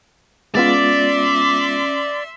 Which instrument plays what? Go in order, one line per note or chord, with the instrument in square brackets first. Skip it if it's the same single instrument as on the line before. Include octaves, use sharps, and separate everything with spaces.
[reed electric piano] G#3 B3 F4 [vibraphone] C#4 [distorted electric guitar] D5 [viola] E5 C6